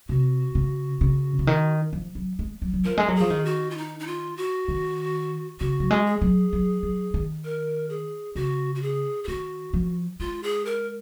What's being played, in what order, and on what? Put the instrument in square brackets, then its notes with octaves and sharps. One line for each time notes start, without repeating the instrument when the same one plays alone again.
[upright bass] C3 [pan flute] F#4
[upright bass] C#3
C#3
C#3
D#3
F3
F#3
G#3
F#3
F#3
[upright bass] F3 [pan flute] A#4
[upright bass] G#3
F#3
[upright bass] F3 [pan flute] G#4
[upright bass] D#3
[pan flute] F#4
F4
D#4
D#4
F4
F#4
[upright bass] D#3
[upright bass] C#3 [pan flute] F#4
[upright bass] F#3
G#3
[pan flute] G#4
[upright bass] F#3
F#3
F#3
D#3
[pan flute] A#4
G#4
[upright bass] C#3 [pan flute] F#4
[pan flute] F#4
G#4
G#4
[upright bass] D#3 [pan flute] F#4
[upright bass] F3
[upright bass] G#3 [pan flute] F4
[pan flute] G#4
A#4